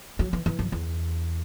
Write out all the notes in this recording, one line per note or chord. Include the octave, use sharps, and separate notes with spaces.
F#3
E3
E3
F#2
E2